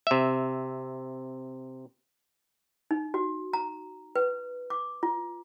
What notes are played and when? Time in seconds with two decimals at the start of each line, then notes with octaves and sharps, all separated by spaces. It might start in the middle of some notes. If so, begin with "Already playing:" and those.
0.07 C3 E5
2.91 D#4
3.14 F#4
3.53 A#5
4.16 B4
4.70 D6
5.03 F4